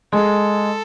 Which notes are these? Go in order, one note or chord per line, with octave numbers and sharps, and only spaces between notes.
G#3 A4